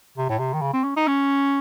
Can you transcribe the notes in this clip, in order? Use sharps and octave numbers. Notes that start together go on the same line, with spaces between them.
C3
A2
C3
D#3
C#3
C4
C#4
D#4
C#4